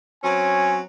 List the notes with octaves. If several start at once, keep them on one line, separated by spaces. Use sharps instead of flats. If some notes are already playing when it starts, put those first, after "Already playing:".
F#3 C4 C#4 G#5